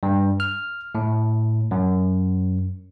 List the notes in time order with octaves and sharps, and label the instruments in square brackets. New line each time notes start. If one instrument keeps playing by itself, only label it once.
[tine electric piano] G2
F6
A2
F#2